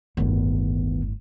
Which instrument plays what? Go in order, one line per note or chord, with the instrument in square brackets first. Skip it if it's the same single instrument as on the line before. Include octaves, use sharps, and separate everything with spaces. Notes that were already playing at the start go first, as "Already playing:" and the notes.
[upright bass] G1 A2 [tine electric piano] D2 D#3 B3